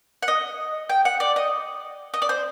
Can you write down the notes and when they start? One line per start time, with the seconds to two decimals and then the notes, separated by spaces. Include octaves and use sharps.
0.23 F#5
0.28 D#5
0.89 G5
1.05 F#5
1.20 D5
1.36 D#5
2.14 D#5
2.22 D5
2.29 C5